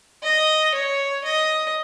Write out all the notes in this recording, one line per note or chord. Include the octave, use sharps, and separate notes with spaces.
D#5
C#5
D#5